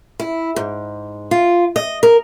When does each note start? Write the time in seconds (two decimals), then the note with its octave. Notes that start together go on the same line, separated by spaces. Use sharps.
0.20 E4
0.56 G#2
1.31 F4
1.76 D#5
2.03 A#4